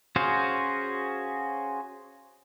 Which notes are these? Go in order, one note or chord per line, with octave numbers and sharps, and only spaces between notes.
C#4 F#4 G#4 C5 F5